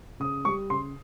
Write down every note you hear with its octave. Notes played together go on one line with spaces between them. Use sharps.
C#3 D#6
G3 C#6
C#3 C6